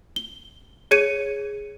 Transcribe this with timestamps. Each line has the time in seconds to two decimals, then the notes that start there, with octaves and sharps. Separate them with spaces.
0.16 G7
0.91 G#4 C#5 G#6 C#7 D#7